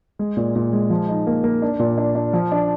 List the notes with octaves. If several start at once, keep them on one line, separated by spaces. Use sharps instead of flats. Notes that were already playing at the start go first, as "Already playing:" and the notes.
G#3
A#2
A#2
G#3
F3
D#4
A#3
A#3
D4
A#2
D4
D4
F3
D4